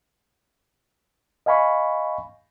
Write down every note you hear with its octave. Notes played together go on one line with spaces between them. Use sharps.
D#5 F5 G#5 B5 C#6